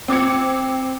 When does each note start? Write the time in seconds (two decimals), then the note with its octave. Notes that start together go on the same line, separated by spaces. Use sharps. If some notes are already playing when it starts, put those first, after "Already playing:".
0.08 C4 D6 G#6 C#7